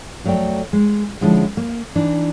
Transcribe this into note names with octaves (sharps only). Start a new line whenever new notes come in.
F2 F#3 A3 D5 G5
G#3
D3 F3 G#3 C#4 E4
A#3
E3 D4 D#4